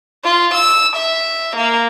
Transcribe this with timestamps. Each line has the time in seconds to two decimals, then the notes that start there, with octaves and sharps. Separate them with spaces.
0.24 F4
0.54 E6
0.96 E5
1.56 A#3